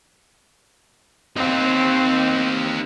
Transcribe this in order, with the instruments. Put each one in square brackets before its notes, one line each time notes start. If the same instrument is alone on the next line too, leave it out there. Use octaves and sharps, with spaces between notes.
[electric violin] C4 [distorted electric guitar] D#4 G4